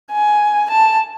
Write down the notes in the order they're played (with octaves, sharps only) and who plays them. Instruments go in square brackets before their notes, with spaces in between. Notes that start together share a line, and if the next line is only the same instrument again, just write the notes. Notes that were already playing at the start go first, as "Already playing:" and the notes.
[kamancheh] G#5
A5